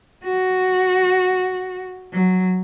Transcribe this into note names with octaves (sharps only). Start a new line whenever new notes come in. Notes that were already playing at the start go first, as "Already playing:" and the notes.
F#4
F#3